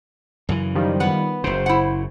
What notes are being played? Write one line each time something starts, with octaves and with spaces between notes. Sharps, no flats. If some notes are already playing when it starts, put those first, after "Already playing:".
F#2 C#3 E3
D#3 F3 G3
B3 B4 F#5
F#1 C#3 C5
E4 F#5